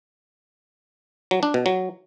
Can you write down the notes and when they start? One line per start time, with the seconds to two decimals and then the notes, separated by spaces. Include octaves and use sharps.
1.31 F#3
1.43 D4
1.54 B2
1.66 F#3